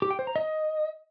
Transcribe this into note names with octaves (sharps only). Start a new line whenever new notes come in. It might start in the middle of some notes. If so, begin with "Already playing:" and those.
G4
G5
C5
A#5
D#5